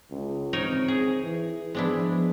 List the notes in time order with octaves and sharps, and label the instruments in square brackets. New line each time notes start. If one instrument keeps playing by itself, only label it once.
[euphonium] C#2
[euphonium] C4 [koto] D#4 A#4 C#5
[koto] G#4
[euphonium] E3
[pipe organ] F3 [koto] G#3 D4 E4 [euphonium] B3